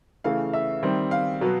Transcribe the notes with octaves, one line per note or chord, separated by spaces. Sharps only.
C#3 E3 A3 F5
E5
D#3 G3 C4
F5
B2 F#3 B3